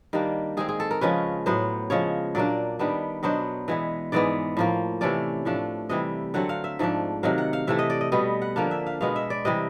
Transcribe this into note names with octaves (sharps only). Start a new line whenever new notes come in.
D#3 G3 A#3 D4
D#3 G#3 C4 G#4
G#4
A4
A#4
C#3 F3 G#3 C#4 B4
A2 F#3 B3 C5
C#3 F3 G#3 C#5
A#2 F#3 A#3 D4 D5
D#3 G3 B3 D4
B2 F#3 B3 D4 C5
E3 G#3 B3
G#2 E3 G#3 B3 D5
A2 F3 A#3
C3 E3 A3 C#4 D5
A2 F3 A3 D4
C3 E3 G3 D#5
D3 F#3 A3 C4 F#5
F5
E5
G#2 F3 A3 D4
C3 D#3 F#3 F5
F#5
F5
C3 E3 A3 E5
D#5
D5
D#5
B2 G3 B3 D#5
F#5
D3 F3 A#3 D4 F5
E5
F5
B2 G#3 B3 F5
E5
D5
C3 E3 G3 D#5